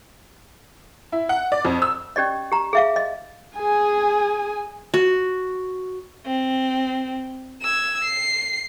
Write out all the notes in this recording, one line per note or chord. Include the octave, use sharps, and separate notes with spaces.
E4
F#5
D5
F2
E6
C#4 G4 D5 D#5
G4 A#5
G#4 E5 F5
D#5
G#4 G#5
F#4
C4
E6 G#6
C7